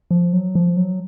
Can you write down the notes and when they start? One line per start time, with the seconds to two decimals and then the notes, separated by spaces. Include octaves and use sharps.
0.11 F3
0.33 F#3
0.55 F3
0.77 F#3